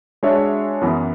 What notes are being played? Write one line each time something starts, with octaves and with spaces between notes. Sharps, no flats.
G#3 D4 F#4 C#5 E5
F#2 E3 B3